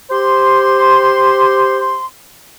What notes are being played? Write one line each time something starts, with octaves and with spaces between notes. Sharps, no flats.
G4 C5 C6